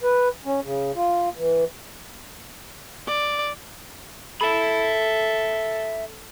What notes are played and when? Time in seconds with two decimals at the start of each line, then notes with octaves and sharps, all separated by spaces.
0.03 B4
0.45 C#4
0.63 C#3
0.95 F4
1.37 E3
3.07 D5
4.41 A4 E5 B5